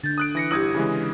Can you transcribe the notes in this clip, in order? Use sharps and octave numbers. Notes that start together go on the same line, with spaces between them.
D3 G6 A6
D#6 F#6 D7
E3 A#6 C#7
G1 E4 G4 D#6 G#6
C#3 E3 G#3